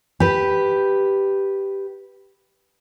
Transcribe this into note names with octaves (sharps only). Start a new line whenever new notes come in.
G4 B4